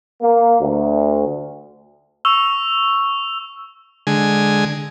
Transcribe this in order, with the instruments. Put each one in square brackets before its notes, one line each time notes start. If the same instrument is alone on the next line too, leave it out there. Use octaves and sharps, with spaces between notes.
[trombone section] A#3
D2
[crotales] C#6 E6 F7
[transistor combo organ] D3 G#3 G#5